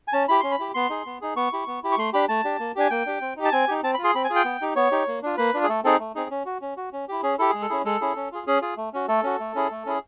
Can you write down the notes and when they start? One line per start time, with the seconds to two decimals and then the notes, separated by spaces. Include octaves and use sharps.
0.08 G#5
0.13 C#4 A5
0.28 E4 G4 B5
0.40 C#4 C6
0.52 B5
0.59 E4 G4
0.74 B3 C6
0.90 D#4 G#4
1.06 B3
1.21 D#4 G#4
1.36 B3 C#6
1.53 E4 G4
1.67 B3
1.83 E4 G4
1.92 C#6
1.98 A3 C6
2.13 D4 G4 B5
2.29 A3 A5
2.44 D4 G4
2.59 A#3
2.75 D4 G4 G#5
2.90 A#3 G5
3.06 D4 G4
3.21 C4
3.37 D#4 G4
3.45 A5
3.52 C4 G#5
3.68 D#4 G4
3.83 C4 A5
3.94 B5
3.99 F4
4.04 G#4 C6
4.15 C4 B5
4.24 G#5
4.30 F4 G#4
4.36 G5
4.45 B3
4.61 D#4 G4
4.76 B3 C#5
4.92 D#4 G4
5.08 A#3
5.22 D4 F4
5.37 A#3 B4
5.54 D4 F4
5.64 G#4
5.68 A3 A4
5.84 C4 D#4 G#4 A4
6.00 A3
6.15 C4 D#4 G#4
6.31 C#4
6.45 F#4
6.62 C#4
6.77 F#4
6.93 C#4
7.08 E4 G4
7.23 C#4 G#4
7.39 E4 G4 A4
7.50 G#3 G#4
7.62 A4
7.69 C#4 E4 G#4
7.84 G#3 A4
8.01 C#4 E4 G#4
8.16 C#4
8.32 F4 G#4
8.47 C#4 G#4
8.62 F4 G#4
8.77 A3
8.93 C#4 F#4
9.08 A3 A4
9.23 C#4 F#4
9.40 A3
9.55 C#4 E4 G#4
9.71 A3
9.86 C#4 E4 G#4